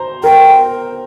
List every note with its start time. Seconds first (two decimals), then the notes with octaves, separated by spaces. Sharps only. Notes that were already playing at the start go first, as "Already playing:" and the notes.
Already playing: C5 A#5 C6
0.24 A#4 G5